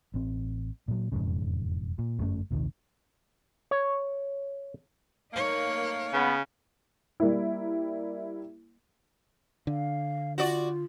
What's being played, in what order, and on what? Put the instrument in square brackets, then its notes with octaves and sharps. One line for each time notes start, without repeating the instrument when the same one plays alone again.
[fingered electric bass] A1 C4
A#2 F#3
E1 F2 G#2 C#3
A#2
G1 F#2 A3 C#4
A#1 D#2 C3 D#3
[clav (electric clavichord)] C#5
[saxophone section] A3 A#3 [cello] D#4 C#5
[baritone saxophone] C#3 [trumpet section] B3
[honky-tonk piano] G3 A#3 E4
[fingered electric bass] D3 [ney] F5
[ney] F4 [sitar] F#4 D5